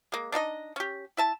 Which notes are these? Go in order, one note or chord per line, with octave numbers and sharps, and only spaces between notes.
G#3 A#3
D4 D#4 F#4 D#5
C#4 G4
E4 E5 A5